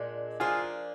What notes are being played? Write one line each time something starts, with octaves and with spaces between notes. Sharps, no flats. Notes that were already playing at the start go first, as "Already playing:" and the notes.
Already playing: A#2 G#3 D4
F3 A#3 D4 F4 G#4